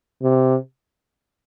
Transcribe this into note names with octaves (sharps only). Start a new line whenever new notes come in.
C3